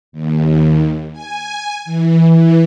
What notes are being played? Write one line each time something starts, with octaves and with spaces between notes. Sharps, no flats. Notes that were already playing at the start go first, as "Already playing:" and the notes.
D#2
G#5
E3